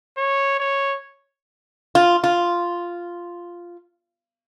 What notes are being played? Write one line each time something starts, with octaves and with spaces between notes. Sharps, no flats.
C#5
C#5
F4
F4